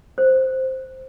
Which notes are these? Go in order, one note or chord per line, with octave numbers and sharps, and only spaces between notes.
C5